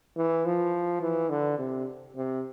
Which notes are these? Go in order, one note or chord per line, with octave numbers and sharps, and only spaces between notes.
E3
F3
E3
D3
C3
C3